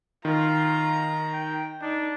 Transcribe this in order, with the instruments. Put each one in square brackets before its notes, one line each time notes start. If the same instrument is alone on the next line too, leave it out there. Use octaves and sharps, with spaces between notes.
[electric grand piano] D#3 [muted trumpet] F4 [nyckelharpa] A#5
[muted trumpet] G5
[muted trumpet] D4 [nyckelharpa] D#4